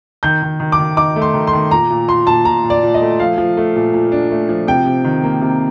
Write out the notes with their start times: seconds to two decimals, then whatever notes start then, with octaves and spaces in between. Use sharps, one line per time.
0.23 D#3 G6
0.42 D#3
0.60 D#3
0.72 D6
0.79 D#3
0.97 D#4 D6
1.16 A3
1.22 C6
1.34 D#3
1.47 C6
1.53 D#3
1.71 A#2 A#5
1.91 A#2
2.08 A#2 C6
2.27 A#2 A5
2.45 A#2 A#5
2.64 A#2
2.70 D5
2.83 A#2
2.94 D#5
3.01 A3
3.20 F3 F5
3.38 F3
3.57 A3
3.76 A#2
3.94 A#2
4.12 D4
4.31 A3
4.49 F3
4.67 C3 G5
4.86 C3
5.04 D#3
5.24 A#3
5.41 C3